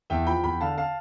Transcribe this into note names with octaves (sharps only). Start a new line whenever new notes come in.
E2 E5 G5
F3 G5 B5
E2 G5 B5
D3 F5 A5
F5 A5